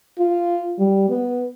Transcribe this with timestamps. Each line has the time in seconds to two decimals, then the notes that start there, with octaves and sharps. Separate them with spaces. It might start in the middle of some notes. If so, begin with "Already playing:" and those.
0.19 F4
0.79 G3
1.10 B3